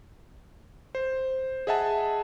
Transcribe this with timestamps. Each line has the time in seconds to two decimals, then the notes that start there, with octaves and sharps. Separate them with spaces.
0.95 C5
1.67 G#4 D#5 E5 F#5 A5